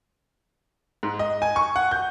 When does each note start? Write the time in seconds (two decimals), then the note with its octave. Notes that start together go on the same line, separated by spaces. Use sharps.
1.03 G#2
1.19 D#5
1.42 G#5
1.56 C#6
1.76 F#5
1.91 G6